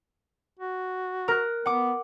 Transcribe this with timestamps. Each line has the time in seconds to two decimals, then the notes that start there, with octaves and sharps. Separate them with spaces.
0.59 F#4
1.28 A#4 F#6
1.66 B3 F#5 D6